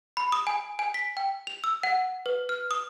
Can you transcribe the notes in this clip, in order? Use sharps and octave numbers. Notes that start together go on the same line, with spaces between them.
B5
D#6
G#5
G#5
B6
G5
F7
E6
F#5
B4
F6
D#6